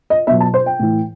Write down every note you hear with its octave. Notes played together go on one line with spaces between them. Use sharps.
D#5
B2 F#3 E5
A5
C5
G5
A2 E3